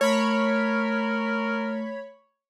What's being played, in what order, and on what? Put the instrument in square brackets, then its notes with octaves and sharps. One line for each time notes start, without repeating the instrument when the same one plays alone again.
[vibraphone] A3 [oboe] A#4 [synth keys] C#5 B5